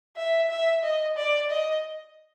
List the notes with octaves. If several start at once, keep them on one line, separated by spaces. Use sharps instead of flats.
E5
E5
D#5
D5
D#5